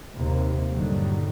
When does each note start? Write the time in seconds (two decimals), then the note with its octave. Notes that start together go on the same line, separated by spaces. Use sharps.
0.16 D#2 C3 A#3
0.70 G2 A#2 D3 D#3 F#3 G3